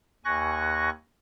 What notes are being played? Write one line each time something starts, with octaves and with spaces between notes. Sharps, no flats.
D#2 G#5 C#6 F#6 A#6